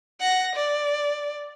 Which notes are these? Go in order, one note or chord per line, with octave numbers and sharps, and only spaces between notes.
F#5 A#6
D5